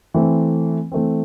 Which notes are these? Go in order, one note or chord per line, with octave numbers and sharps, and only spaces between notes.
E3 A3 C4
E3 A3 C4